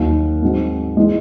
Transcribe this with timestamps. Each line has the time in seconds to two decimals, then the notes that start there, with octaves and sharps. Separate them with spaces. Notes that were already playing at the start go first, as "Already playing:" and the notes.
Already playing: D#2 D#3 F#3
0.42 G#2 F#3 C4
0.97 E3 G#3